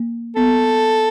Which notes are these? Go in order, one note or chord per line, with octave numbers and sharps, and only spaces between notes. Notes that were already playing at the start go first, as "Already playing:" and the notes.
Already playing: A#3
B3 A4